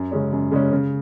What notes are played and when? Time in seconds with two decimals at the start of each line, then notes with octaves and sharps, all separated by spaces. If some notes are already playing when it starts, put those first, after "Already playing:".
Already playing: F#2
0.11 C#3 G#3 C#4
0.32 F#2
0.51 C#3 G#3 C#4
0.72 C#3